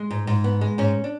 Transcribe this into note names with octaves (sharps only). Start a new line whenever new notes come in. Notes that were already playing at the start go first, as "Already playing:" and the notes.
Already playing: G#3
G#2
G#2
B3
G#3
G#2 C#4
D4